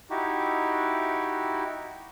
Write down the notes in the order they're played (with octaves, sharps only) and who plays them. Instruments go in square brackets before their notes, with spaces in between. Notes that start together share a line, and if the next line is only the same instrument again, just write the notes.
[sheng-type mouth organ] D#4 E4 F#4 G4